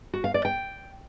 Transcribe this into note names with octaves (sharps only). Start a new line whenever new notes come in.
F#4
F5
D5
G5